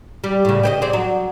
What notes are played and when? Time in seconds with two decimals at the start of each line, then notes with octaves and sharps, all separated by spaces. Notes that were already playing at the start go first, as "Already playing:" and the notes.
0.24 G3
0.45 A2 C#3
0.63 G4 C5 D#5
0.82 C4 G#4 D5
0.93 F#3